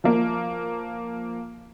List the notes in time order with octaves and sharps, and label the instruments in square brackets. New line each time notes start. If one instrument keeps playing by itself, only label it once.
[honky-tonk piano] F3 A#3